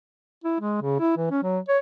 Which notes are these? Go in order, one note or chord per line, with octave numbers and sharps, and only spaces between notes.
E4
G#3
C#3
E4
E3
C#4
F#3
C#5